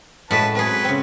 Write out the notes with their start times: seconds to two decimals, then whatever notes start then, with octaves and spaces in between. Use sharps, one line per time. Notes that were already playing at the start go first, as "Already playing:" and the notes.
0.31 A2 G#3 F#4 B4 A5
0.55 F#3 C4 G#4 B4
0.84 C#3 C4